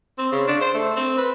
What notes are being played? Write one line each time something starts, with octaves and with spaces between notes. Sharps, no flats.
C4
C#3
D4
C5
A3
C4
B4